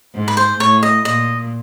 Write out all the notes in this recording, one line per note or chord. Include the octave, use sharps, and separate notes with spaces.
G#2
B4
C5
A2 C#5
D#5
A#2 D#5